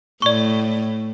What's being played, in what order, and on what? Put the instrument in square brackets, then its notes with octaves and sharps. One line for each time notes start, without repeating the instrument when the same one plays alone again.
[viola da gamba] A2 [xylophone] D5 C#6